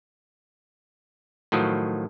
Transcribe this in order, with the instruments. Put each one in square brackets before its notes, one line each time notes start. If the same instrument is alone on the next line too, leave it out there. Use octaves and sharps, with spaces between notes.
[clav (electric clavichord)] A2 D#3 F3 F#3